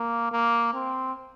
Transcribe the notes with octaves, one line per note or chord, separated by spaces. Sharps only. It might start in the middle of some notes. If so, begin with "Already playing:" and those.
Already playing: A#3
A#3
C4